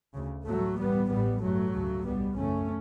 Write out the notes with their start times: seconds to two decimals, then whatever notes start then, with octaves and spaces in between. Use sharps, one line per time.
0.14 D2 C#3
0.45 A1 A2 F#3 A3
0.77 A1 G2 G3 B3
1.09 A1 A2 G3 B3
1.41 A1 G2 F#3 A3
1.73 D2 C#3
2.04 B1 B2 G3 B3
2.36 F#1 E2 C#3 A3 C#4